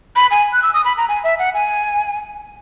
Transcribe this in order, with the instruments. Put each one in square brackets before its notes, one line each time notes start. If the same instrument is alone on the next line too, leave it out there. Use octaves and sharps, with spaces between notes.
[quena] B5
G#5
F#6
E6
D#6
B5
A#5
G#5
E5
F#5
G#5